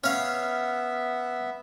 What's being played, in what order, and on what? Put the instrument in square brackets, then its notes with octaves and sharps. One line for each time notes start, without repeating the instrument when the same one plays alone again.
[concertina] B3 E5 [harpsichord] C#4 F5